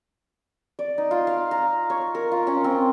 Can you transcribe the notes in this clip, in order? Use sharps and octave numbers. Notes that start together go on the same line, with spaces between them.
D5
D#4
F4
F5
A#5
C#5
A#4
F4
C#4
C4